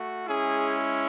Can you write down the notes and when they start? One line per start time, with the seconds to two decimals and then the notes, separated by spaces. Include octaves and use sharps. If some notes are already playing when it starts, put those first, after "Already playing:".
Already playing: A3 F#4
0.27 G#3 C#4 E4 G#4